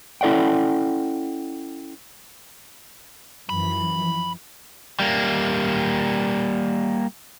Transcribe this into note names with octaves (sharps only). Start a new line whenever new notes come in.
C#4 E4 A4 D5 F#5 G5
F#2 E3 F3 B5
G3 A#3